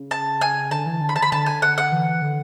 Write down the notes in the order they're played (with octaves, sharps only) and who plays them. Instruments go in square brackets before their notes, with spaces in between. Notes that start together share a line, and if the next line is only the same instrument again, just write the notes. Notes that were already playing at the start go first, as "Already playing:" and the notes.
Already playing: [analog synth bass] C#3
[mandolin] A5
G#5
[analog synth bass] D3 [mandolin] A5
[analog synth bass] E3
D3
[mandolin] B5
A5
B5
[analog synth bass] D3 [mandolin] A5
[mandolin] G#5
F#5
F#5
[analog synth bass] E3
D3